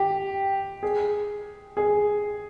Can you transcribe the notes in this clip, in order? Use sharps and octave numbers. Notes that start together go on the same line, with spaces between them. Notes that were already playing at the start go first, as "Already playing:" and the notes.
Already playing: G4
G#4
G#4